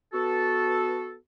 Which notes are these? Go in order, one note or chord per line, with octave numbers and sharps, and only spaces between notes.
B3 F#4 A4